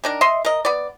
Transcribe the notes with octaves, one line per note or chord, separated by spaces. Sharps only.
D#3 D4 A#4
D#5 E5 C6
A#4 D#5
B3 D5